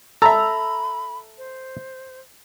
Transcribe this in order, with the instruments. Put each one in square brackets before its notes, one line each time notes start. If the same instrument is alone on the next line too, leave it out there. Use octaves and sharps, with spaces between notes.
[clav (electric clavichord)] A4 E5 [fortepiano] A#5 [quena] B5
[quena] C5